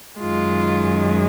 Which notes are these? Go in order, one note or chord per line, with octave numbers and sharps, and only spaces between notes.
F#2 D#3 G#3 F4